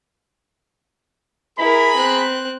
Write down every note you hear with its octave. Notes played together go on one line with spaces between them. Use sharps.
E4 G#4 A#4 A#5 B5
C4 F#6